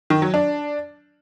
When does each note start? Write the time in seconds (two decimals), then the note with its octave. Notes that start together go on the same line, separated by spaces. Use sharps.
0.10 D#3
0.22 F#3
0.34 D4